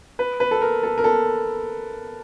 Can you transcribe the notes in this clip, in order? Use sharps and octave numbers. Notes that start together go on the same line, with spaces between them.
B4
B4
A4
A#4
A4
A#4
A4